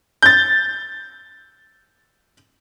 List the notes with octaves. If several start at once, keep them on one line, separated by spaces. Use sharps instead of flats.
G6 A6